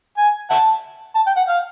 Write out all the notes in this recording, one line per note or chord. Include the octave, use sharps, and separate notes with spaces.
G#5
E5 F#5 A5
A5
G5
F#5
F5